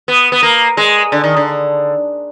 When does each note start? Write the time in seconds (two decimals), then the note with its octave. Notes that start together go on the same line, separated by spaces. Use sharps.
0.08 B3
0.32 B3
0.43 A#3
0.77 G#3
1.12 D3
1.24 D#3
1.37 D3